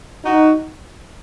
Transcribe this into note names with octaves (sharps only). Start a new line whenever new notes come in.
D#4 F#4